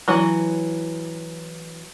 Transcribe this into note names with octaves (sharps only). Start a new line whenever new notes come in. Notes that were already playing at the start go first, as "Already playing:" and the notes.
E3 F#3